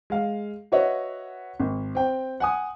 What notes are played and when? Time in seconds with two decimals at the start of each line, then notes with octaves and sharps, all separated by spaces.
0.10 G#3 F5
0.72 F#4 B4 C#5 D#5 E5 F#5
1.60 G#1
1.95 C4 G5
2.40 F#5 G#5 D#6